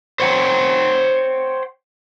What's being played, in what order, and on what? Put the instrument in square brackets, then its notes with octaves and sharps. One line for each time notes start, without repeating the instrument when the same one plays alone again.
[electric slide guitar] C5 C#5 F#5 G5